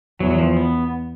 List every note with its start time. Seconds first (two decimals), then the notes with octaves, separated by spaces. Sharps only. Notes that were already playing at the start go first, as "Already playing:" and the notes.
0.20 E2 F#3
0.30 F#3
0.38 F3
0.57 B3